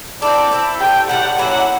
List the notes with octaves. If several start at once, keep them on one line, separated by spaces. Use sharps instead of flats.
C4 E4 A4 D5
C4 E4 A4
A2 E3 G3 G5
A2 E3 G3 F#5
F#3 A#3 C#4 E4 F#5